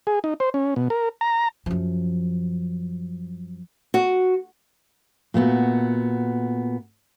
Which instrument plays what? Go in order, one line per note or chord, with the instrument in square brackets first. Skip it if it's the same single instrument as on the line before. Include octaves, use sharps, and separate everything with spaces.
[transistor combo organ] G#4
D#4
C5
C#4
B2
A#4
A#5
[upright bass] F#2 F3
[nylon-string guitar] F#4
[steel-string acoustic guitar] A#2 A3 B3 F#4